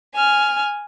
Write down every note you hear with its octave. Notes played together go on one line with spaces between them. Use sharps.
G#5 F6